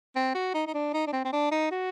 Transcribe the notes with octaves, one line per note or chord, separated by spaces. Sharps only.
C4
F#4
D#4
D#4
D4
D#4
D4
C4
C4
D4
D#4
F#4